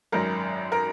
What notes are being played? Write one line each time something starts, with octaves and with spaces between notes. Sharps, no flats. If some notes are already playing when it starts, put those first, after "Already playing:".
G#1 F#2 F#3 A#4
A#4